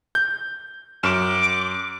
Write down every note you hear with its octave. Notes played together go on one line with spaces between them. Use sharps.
G6
F#2 D6 F6 E7